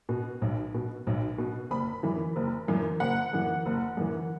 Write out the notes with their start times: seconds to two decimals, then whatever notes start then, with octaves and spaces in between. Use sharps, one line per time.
0.09 B2
0.42 B1
0.74 B2
1.07 B1
1.38 B2
1.71 F#1 B5
2.03 F#2 E3
2.36 F#1
2.68 F#2 E3
3.00 F#1 F#5
3.33 F#2 E3
3.66 F#1
3.97 F#2 E3